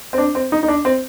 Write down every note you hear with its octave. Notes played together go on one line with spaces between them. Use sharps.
C4
D4
C4
D#4
D#4
D4
C4